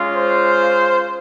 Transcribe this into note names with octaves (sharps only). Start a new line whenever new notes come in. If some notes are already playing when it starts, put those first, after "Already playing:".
Already playing: G#3 C#4 F4
C5